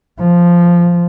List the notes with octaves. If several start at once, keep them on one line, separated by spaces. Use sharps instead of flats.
F3